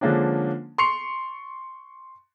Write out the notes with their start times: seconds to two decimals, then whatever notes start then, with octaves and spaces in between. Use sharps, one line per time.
0.01 D3 F3 G#3 A#3 C#4 D4
0.78 C6 C#6 C7 C#7 F7